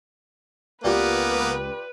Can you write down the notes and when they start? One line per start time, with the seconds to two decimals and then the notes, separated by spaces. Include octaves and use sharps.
0.84 C#2 A#3 B3 F4 G4 B4 D5